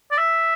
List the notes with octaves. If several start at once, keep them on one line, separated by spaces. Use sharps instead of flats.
D5
E5